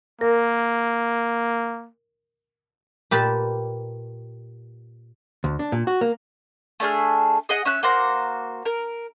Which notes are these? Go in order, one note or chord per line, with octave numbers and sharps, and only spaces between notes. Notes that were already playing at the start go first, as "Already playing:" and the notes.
A#3 A#4
A#2 G4 B4 D5 A5
D2
D4
A#2
F#4
A#3
A3 D4 G#4 F6
G#4 D#5 F#5
C#4 E5 F#6
A#3 F#4 C5 A#5
A#4